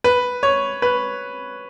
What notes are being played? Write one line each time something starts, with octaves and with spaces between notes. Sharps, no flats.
B4
C#5
B4